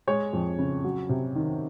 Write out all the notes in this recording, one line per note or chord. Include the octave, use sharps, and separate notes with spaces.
G#3 C#5
F2
C#3
F#3
C3
D#3